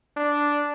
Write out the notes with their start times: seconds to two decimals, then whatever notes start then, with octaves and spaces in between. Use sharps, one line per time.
0.17 D4